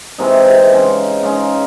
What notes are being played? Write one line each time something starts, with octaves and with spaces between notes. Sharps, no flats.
C3 E3 G#3 D#4
C#3 G#3 D#4
C#3 G#3 D#4